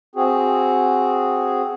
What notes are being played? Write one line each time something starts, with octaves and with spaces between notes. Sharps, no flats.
C4 F#4 G#4